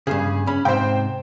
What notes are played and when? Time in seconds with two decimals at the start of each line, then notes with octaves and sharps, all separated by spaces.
0.07 G2 A#2 C#3 G#4
0.47 C#4 B5
0.65 G#2 C3 C5 G5